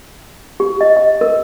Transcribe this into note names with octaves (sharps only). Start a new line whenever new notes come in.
G4
D#5
D#5
A#4